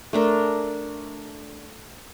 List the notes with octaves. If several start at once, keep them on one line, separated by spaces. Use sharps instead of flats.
A3 D4 A#4